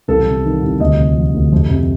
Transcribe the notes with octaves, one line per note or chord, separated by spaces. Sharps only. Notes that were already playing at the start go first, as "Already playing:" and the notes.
C2 A4
C3
D#3
C2
D2 D#5
C3
F3
D2
F2
C3